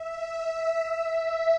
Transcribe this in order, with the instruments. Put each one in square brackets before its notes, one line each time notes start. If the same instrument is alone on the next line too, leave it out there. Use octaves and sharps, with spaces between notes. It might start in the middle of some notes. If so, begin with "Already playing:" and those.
Already playing: [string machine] E5